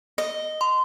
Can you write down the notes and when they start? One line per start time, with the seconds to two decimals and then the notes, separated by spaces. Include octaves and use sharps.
0.18 D#5
0.61 C6